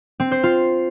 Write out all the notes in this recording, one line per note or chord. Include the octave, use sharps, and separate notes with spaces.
C4
C5
F4